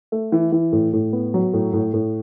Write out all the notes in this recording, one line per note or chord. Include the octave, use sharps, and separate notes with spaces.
A3
E3
E3
A2
A2
B3
F#3
A2
A2
A2